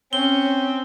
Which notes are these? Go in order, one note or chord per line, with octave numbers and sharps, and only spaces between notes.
C4 C#4 G7